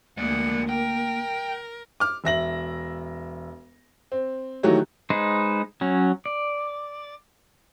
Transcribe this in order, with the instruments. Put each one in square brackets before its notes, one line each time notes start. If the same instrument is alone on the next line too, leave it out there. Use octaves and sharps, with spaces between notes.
[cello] D2 F#5 [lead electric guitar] G#3 D5 [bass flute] A#3
[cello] A#4 [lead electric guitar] G5
[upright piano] D6 F6
E1 E5 A#6 F#7
C4
D#3 E3 F#3 A3 F#4 G4
[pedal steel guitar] G#3 D#4 B4 C5
F#3 C#4
D5